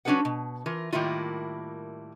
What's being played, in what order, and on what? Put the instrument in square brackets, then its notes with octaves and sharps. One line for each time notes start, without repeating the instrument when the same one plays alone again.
[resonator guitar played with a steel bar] F#3 C#4 D4 G#4 B4 F#5
B2
E3 F4 A#4
A2 D#3 G3 A#3 E4 F4